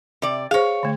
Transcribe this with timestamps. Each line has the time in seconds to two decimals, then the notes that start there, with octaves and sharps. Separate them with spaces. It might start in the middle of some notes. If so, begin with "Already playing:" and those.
0.22 C3 D5
0.51 G#4 C5 C#5 F5
0.83 D3 A3